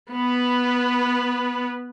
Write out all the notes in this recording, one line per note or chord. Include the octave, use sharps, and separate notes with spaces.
B3 B4